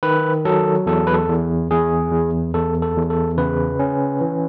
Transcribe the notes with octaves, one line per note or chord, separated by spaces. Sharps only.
D#3 B4
F#3 A4
E2 A4
B4
A4
E2
E2 G#4
E2
E2 A4
A4
E2
A4
C#3 B4
C#4
E3